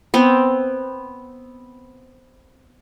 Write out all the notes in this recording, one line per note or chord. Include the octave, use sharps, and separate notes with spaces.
B3 C4